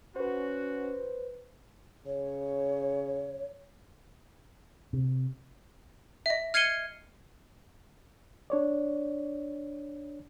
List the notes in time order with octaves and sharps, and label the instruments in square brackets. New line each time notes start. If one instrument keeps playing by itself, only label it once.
[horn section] C#4 F#4 [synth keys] B4 C5
[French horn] C#3 [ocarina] C#5
[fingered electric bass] C3
[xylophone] D#5 E5
F6 G#6 C7 C#7 D#7 G7
[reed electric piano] D4 C#5 D5